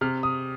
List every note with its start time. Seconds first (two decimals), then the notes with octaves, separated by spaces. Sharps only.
0.01 C3 F6
0.23 D#6